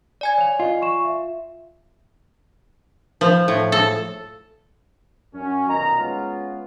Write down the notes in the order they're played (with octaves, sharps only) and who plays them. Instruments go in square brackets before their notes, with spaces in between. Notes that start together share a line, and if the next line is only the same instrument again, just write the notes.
[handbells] D5 G#5 G#6
[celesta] C#5 F5 F7
[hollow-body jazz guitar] F4 [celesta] D#5
[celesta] C6 C#6 E7
E5
[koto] F3
A2
A4
[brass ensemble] F#2 C#4
B1 A#2 D#3 D#5 A#5
G#3 B3 C#4 F4